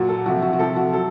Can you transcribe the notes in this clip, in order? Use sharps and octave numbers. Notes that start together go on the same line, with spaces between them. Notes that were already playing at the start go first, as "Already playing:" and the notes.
Already playing: A#2 F#3 F#4
A4
C3 F3 F#4
F#4
F#4
C3 F3 A4
F#4
F#3 A4